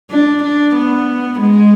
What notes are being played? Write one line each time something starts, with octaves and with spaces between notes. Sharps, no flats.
D4
D4
B3
G#3